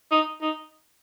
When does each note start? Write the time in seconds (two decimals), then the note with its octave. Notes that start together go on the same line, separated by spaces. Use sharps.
0.11 D#4
0.41 D#4